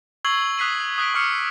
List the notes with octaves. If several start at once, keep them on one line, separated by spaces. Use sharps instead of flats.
C#6 E6 G#6 C7 F#7 G7
D#6 F#6 B6 C7 D#7 F#7
D#6 F#6 B6 D7
C#6 D6 F6 C7 C#7